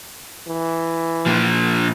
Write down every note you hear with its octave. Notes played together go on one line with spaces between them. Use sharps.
E3
A#2 F3